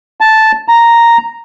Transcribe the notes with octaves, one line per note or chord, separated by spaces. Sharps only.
A5
A#5